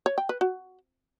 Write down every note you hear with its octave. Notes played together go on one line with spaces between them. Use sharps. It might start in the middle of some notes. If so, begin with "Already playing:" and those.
C#5
G5
B4
F#4